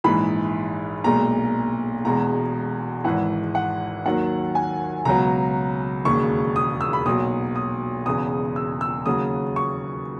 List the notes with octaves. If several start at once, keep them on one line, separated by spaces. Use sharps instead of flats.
A#1 G#2 E3 B5
B1 A#2 G#3 A#5
E1 E2 B2 G#3 A#5
G#1 G#2 E3 F#5
F#5
D#2 D#3 F#3 F#5
G#5
C#2 B2 F#3 A#5
E1 D#2 C#3 C#6
D#6
E6
B5
B1 A#2 F#3 D#6
D#6
E1 E2 C#3 D#6
E6
E6
D#2 C#3 F#3 D#6
C#6